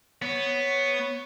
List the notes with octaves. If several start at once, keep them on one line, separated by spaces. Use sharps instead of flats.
B3 C#5